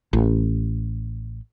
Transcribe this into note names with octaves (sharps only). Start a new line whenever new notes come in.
A1